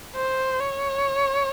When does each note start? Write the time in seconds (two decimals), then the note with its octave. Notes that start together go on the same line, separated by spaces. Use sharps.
0.15 C5
0.60 C#5